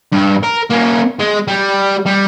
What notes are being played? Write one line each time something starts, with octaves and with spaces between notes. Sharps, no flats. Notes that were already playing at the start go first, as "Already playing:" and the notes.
G2
A#4
A#3 C#4
G#3
G3
G3